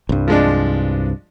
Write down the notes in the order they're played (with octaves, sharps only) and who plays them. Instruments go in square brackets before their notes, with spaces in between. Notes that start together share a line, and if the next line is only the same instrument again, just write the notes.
[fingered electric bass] C2 G2
[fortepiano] F3 G#3 D4